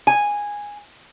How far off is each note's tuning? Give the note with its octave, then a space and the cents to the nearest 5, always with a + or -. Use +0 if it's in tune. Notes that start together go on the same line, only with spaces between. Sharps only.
G#5 -10